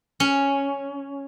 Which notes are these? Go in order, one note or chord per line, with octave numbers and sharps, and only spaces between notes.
C#4